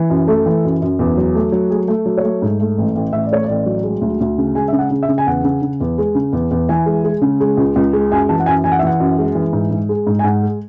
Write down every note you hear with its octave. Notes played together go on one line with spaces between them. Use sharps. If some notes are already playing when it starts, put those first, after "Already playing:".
Already playing: E3
F#2
A3 A4
E3
F#2
F#2
E2
F#3
A3
F#3
A3 G#4
A3
F#3
C#5
A3
G#2
A3
A1
A1
A1 E5
D5
A3 C#5
D5
A1
F#3
G#3
D2
D2
C#3
G#3 G#5
C#3 E5
F#5
C#3
E5
C#3
G#5
E2 F#5
C#3
C#3
E2
G#3
C#3
E2
E2
E3 G#5
G#3
G#3
C#3
G#3
C#2
C#2
G#3
F#2 G#5
E3 A5
F#5
F#2 G#5
E3 G#5
F#5
E5
E3 F#5
F#2
G#3
E3
G#2
G#2
G#3
G#2
G#5
G#2 F#5
G#3